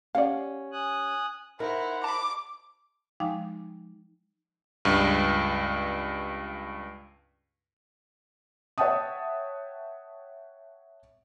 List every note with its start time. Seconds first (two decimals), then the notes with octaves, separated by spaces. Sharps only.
0.15 C#4 G4 D5 F5 F#5
0.72 G#5 D#6 F#6
1.60 D#4 E4 A#4 C5 F#5 A#5
2.04 A5 B5 D6
3.20 F3 G#3 D#4 F5 G5 D6
4.85 C#2 G2
8.78 C#5 E5 F#5 G5 A5 D#6